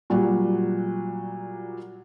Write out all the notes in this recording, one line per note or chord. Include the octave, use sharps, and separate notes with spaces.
A#2 F#3 G3 F#4